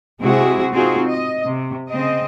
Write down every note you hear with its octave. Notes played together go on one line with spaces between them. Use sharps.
C3 G#3 E4 F#4 G#4
C4 D#4 F4 F#4 G#4
D#5
C3
C#3 C4 D#5